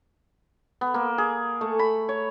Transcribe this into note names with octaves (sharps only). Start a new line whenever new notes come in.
B3
A#3
G#4
A3
B5
C#5